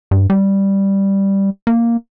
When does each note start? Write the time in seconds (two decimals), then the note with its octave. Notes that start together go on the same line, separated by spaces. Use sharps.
0.11 G2
0.30 G3
1.67 A#3